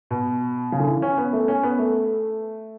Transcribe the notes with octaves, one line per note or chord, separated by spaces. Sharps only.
B2
C#3
D3
E3
C#4
B3
A3
C#4
B3
A3